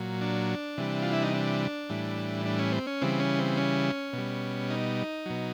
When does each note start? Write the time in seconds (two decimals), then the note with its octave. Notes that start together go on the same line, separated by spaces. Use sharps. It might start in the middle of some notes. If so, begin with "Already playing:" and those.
Already playing: A#2 F#3
0.21 D4
0.78 C3 E3 G3
1.02 F4
1.12 E4
1.23 D#4
1.34 D4
1.90 A2 E3 G3
2.46 D4
2.59 C#4
2.72 C4
2.87 C#4
3.01 C#3 E3 G3 C4
3.20 C#4
3.39 C4
3.57 C#4
4.13 B2
4.18 G3
4.70 D#4
5.26 B2 F#3